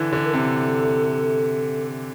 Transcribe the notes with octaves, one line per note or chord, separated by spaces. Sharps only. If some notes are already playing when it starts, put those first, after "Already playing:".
Already playing: D3 E3
D3
A#4
C3 A4